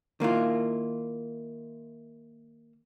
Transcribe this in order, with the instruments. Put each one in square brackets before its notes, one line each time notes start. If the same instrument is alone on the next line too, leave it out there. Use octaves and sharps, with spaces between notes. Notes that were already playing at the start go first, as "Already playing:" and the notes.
[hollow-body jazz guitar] D#3 A#3 E4 F4